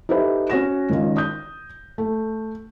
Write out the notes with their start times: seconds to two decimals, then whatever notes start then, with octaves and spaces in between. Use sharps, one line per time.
0.09 D#4 E4 G4 A4 B4 E5
0.50 C#4 F#4 F#5 A#6 E7
0.90 G#1 D#3 C#4 F4
1.17 D#6 G6
1.98 A3